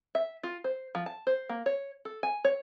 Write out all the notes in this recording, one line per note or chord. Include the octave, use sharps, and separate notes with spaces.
E5
F4
C5
F3
A5
C5
A#3
C#5
A4
G#5
C#5